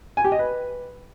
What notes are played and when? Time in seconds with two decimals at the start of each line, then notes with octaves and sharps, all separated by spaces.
0.17 G#5
0.24 G4
0.32 D#5
0.39 B4